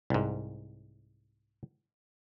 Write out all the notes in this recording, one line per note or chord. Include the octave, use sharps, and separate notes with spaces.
C2 G#2